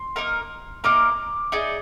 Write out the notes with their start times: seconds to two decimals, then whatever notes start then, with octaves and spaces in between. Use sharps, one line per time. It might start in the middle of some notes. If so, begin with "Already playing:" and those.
Already playing: C6
0.16 A#3 D#4 A#4
0.84 A#3 D#4 A#4 D6
1.52 D#4 G#4 D5